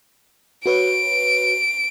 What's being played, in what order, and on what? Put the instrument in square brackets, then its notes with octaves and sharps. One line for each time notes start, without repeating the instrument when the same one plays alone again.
[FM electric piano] F#4 B4 C#5 [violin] D7